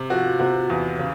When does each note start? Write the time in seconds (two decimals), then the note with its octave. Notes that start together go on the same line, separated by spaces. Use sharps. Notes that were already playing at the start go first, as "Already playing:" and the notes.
Already playing: C3
0.10 F3 F#4
0.40 C3 F#4
0.70 E2
0.99 C#3